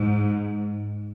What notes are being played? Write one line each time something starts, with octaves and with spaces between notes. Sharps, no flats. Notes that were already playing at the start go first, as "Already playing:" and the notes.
Already playing: G#2